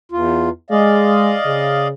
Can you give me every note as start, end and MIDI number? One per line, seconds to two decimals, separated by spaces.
0.12 0.49 40
0.12 0.49 65
0.70 1.36 56
0.70 1.88 74
0.70 1.88 75
0.70 1.88 77
1.45 1.92 49